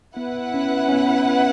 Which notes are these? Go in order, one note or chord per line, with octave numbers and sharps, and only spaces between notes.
B3 E4 B4 F#5
C#4
C#4
B3